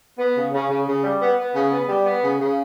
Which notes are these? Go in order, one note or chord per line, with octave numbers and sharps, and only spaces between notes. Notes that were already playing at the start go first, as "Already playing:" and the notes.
B3
C#3
C#3
C#3
C#3
G3
B3
B3
C#3
B3
G3
B3
C#3
C#3